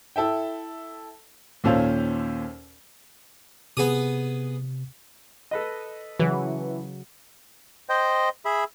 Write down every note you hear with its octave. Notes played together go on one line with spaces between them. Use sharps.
E4 A4 E5 G5
D#2 A#2 C#4 A4 C5 F5
C3 B3 G#4 D#6
A4 B4 D#5
C#3 E3 F#3 F#4
C5 D#5 G5
G#4 E5 B5